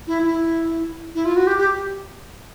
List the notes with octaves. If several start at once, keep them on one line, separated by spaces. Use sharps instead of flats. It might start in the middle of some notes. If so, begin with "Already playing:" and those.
E4
E4
E4
F4
F#4
G4
G4